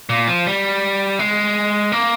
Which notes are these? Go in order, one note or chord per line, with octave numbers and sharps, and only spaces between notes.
A#2
F3
G3
G#3
A#3